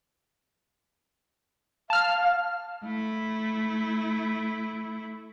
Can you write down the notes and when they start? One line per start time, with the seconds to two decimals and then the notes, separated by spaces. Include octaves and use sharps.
1.90 F5 A5 F6
2.84 A3 E4